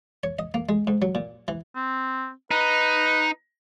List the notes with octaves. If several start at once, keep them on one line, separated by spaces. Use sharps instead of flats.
C#5
D#5
A#3
G#3
G#2
F#3
A#2
E3
C4
D#4 B4